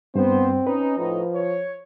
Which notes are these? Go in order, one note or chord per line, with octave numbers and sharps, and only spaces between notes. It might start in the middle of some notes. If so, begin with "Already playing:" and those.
G2 B3 C4 C5
C#4 D#4 B4
A2 F3 D#4
C#5